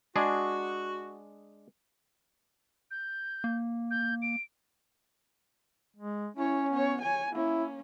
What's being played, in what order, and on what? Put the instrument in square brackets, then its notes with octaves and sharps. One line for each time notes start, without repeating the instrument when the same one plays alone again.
[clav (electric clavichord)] G#3 D4 G#4 [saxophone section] F#4
[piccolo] G6
[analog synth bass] A#3
[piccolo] G6
D7
[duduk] G#3
[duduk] C#4 [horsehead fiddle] E4 C#5
[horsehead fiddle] B3 C#5
C#5 G#5
[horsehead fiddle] A#3 C#4 [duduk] E4